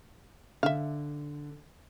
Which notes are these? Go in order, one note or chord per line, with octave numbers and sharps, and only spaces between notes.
D3 E5 F5